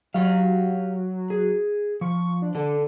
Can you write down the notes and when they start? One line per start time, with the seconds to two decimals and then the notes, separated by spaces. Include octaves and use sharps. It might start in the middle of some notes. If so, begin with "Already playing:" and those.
0.14 F#3 G4 F5
1.30 G#4
2.01 F3 C#6
2.42 D4
2.55 D3 A4